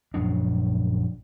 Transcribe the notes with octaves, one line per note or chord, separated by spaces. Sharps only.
A#1 F#2 C#3 D4